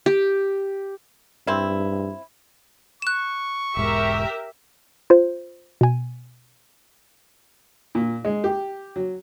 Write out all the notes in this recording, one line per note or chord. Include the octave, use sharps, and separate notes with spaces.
G4
G2 C4 E4
C#6 F#6 E7
E1 G#2 G4 A#4 E5
F4 C5
B2 G#5
A#2
G#3
G4
F#3